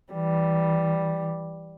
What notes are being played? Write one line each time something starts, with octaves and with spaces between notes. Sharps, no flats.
E3 G3